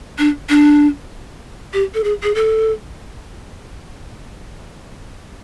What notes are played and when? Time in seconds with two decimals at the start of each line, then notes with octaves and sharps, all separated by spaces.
0.19 D4
0.50 D4
1.73 G4
1.94 A4
2.04 G#4
2.23 G#4
2.35 A4